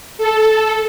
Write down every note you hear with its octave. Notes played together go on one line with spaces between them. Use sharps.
A4